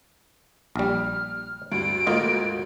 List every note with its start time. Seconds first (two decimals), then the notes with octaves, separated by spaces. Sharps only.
0.76 A#1 G3 F6
1.72 D2 G2 D7
2.07 D2 G#2 A3 A#3 F4 D#5